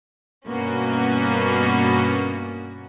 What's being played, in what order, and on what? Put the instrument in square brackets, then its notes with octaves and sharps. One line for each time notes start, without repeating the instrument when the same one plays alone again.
[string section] G2 B2 A#3 B3 C#4 F#4